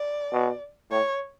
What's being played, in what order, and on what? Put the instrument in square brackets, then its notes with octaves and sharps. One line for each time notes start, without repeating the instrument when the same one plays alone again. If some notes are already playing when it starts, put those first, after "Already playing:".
Already playing: [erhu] D5
[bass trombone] B2
[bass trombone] A2 [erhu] C#5